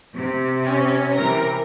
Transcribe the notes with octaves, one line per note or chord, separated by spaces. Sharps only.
C3
C#4
C3 E3 A#4